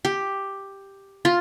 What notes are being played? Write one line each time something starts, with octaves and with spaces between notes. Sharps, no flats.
G4
F4